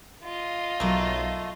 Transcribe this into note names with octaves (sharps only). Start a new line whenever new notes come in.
F4 D#5
B1 F#3 A3 A#3